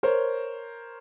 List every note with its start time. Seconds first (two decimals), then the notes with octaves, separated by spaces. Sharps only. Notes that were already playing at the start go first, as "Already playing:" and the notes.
0.03 A#4 C5 C#5